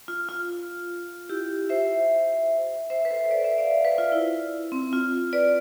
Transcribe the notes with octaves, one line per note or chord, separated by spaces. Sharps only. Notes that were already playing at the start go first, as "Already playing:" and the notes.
F4
F4
E4 G4
C5 E5
C5 E5
B4
A4 C5
B4 D5
C5 E5
D5 F5
B4 D5
F4
E4
C4
F4
B4 D5